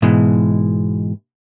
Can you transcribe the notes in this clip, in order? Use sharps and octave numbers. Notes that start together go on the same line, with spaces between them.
G#2 B2 E3 G#3